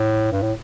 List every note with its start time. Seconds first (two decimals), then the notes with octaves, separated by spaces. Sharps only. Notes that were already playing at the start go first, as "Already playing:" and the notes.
Already playing: A2
0.32 G2
0.42 A2